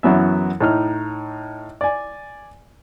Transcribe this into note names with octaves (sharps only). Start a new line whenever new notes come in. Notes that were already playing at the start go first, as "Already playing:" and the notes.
F#2 E3 F#3 B3 E5
A2 D#4 F6
D5 G#5